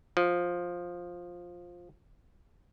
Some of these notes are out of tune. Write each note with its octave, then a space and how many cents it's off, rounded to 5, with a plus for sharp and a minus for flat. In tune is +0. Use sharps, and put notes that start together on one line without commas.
F3 +10